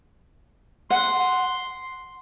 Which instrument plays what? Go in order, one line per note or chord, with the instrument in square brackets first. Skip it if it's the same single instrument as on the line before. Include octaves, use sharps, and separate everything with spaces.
[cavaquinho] F#5 [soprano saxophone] C6